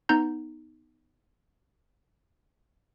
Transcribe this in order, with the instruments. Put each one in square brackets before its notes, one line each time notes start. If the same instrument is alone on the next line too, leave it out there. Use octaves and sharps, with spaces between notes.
[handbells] B3 D#4 A#5 G6